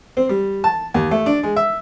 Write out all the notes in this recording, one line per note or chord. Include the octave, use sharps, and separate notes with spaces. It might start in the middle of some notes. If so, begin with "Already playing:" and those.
C4
G3
A5
D#2
A3
D4
G#3
E5